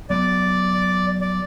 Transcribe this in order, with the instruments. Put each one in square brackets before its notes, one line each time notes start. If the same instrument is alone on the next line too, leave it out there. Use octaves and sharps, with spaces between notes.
[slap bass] F#3 B3 [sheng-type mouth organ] D5
[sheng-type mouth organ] D5